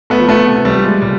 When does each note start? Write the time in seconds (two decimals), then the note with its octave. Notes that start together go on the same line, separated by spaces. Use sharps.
0.10 A3 B3
0.19 F3
0.29 A3 B3
0.47 C3
0.65 G3 A3
0.75 F3
0.84 G#3
1.02 A#2 G3